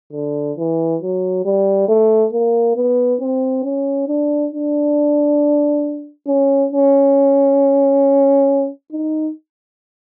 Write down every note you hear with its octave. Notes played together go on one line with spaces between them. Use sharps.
D3
E3
F#3
G3
A3
A#3
B3
C4
C#4
D4
D4
C#4
C#4
D#4